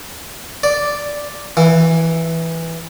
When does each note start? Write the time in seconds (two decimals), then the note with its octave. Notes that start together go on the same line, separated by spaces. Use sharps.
0.63 D5
1.57 E3